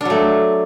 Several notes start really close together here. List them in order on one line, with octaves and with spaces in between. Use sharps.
D4 F#3 A3